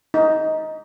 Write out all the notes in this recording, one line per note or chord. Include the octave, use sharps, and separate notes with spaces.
D#4